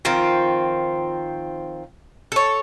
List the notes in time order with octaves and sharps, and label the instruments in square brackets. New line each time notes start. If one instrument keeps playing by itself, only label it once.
[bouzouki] D#3 F3 C4 F4
A4 C#5